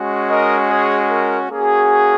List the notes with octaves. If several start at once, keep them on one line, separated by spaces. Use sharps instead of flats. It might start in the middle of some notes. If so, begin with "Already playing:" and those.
Already playing: G#3 C#4 F#4
A#4 D#5
G#4 C#5
A#4
A#3 C#4 F#4 G#4